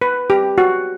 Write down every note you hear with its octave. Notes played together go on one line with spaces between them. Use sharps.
B4
G4
F#4